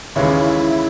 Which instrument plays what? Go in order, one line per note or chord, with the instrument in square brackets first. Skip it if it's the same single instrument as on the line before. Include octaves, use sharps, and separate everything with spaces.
[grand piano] D#2 C#3 E3 G#3 C#4 [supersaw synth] E4